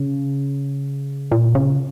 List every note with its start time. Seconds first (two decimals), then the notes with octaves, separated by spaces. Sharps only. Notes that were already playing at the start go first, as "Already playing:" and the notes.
Already playing: C#3
1.31 A#2
1.55 C#3